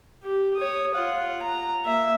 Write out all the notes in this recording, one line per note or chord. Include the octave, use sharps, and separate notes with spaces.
G4
C#5 D#6
F4 F#5
A#5
A#3 E5